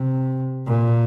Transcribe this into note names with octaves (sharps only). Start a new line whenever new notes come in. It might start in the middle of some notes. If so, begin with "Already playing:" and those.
Already playing: C3
A#2